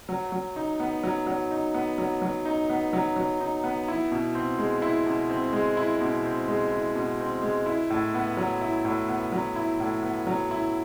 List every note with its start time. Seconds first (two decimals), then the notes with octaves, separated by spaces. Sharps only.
0.09 F#3
0.32 F#3
0.56 D#4
0.80 B3
1.03 F#3
1.27 F#3
1.51 D#4
1.74 B3
1.98 F#3
2.22 F#3
2.45 D#4
2.70 B3
2.93 F#3
3.16 F#3
3.40 D#4
3.64 B3
3.88 E4
4.11 B2
4.35 C4
4.58 G#3
4.82 E4
5.06 B2
5.30 C4
5.53 G#3
5.77 E4
6.01 B2
6.25 C4
6.48 G#3
6.72 E4
6.95 B2
7.20 C4
7.42 G#3
7.66 E4
7.90 A2
8.14 B3
8.37 F#3
8.61 E4
8.85 A2
9.08 B3
9.32 F#3
9.56 E4
9.80 A2
10.03 B3
10.27 F#3
10.51 E4